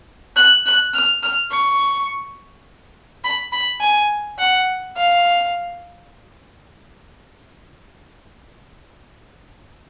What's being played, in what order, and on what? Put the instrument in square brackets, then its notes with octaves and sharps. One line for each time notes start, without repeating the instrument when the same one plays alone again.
[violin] F#6
F#6
F6
F6
C#6
B5
B5
G#5
F#5
F5